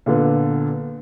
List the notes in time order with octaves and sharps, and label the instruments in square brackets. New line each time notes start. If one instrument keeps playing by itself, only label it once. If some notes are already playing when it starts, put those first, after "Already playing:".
[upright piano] A#2 D3 B3